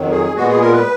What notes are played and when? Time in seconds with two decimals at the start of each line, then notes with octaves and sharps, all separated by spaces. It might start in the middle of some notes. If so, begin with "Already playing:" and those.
Already playing: F2 D#3 F#3
0.11 G#4
0.36 A#2 G#3 B3 F#4
0.48 G#4
0.61 A#4
0.73 B4